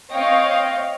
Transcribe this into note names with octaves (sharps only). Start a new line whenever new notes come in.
C4 C#5 D#5 F5 G5